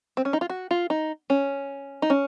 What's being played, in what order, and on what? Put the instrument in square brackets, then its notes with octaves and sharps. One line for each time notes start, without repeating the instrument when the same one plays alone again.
[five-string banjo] C4
C#4
D#4
F4
F#4
F4
D#4
C#4
D#4
C#4